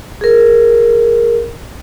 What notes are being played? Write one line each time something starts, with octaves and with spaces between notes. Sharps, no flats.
G#4 A#4